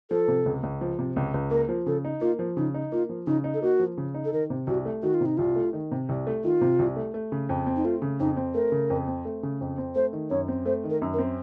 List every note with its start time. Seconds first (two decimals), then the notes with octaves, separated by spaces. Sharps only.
0.10 F3 A4
0.28 C3
0.46 C#2
0.63 C#2
0.81 F3
0.99 C3
1.16 C#2
1.34 C#2
1.51 A#3 A#4
1.69 F3
1.86 C#3 A4
2.05 D#4
2.21 A#3 F4
2.39 F3
2.57 C#3 D#4
2.74 D#4
2.92 A#3 F4
3.09 F3
3.27 C#3 D#4
3.44 D#4
3.54 A4
3.62 A#3 F#4
3.80 F3
3.97 C#3
4.14 D#4
4.25 A4
4.32 D#3 A#4
4.50 C3
4.67 C2 F#4
4.85 A3
5.03 D#3 F#4
5.14 F4
5.21 C3 D#4
5.37 C2 F4
5.56 A3
5.73 D#3
5.91 C3
6.09 C2
6.27 A3
6.44 D#3 F4
6.61 C3
6.79 C2
6.96 A3
7.14 A3
7.32 C#3
7.49 F2
7.67 C4
7.76 D#4
7.85 A3 F4
8.02 C#3
8.20 F2 D#4
8.37 C4
8.54 A3 A#4
8.72 C#3
8.90 F2
9.07 C4
9.25 A3
9.43 C#3
9.61 F2
9.78 C4
9.95 A3 C5
10.13 D#3
10.30 F#2 C#5
10.48 C4
10.66 A3 C5
10.84 D#3
10.90 A#4
11.02 F#2
11.13 A#4
11.19 C4